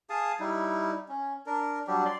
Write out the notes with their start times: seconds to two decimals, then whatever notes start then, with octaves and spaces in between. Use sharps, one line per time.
0.10 G#4 F5 A5 D#6
0.40 G3 D#4 E4
1.09 C#4
1.46 D4 A#4
1.87 F#3 G3 D4 G4
2.05 D5 C6